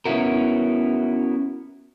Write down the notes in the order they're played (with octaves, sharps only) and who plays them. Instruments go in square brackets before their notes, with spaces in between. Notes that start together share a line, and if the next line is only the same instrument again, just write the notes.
[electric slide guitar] B3 C#4 D#4 E4 F#4 A#4